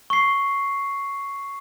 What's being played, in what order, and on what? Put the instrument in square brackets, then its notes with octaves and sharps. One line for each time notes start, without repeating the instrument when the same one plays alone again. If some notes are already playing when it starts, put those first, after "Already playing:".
[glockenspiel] C#6 C7